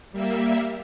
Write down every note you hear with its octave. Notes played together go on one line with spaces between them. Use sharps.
G3 A#3 E5